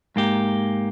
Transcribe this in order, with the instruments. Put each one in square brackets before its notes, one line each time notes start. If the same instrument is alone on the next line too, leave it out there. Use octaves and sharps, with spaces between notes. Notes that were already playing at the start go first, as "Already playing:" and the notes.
[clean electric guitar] G#2 A#3 G4